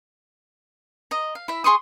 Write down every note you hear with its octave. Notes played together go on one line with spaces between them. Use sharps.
D#5 A#5
F5
E4 E5
G#4 C6 C#6 D#6